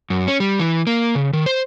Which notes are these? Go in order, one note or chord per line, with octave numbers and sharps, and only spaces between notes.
F#2
C#4
G3
E3
A#3
C#3
D#3
C5